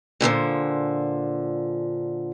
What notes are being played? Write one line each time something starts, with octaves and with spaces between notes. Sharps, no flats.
A#2 D3 E3 F3